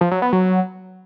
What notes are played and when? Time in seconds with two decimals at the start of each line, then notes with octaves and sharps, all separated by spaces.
0.01 F3
0.11 F#3
0.22 B3
0.33 F#3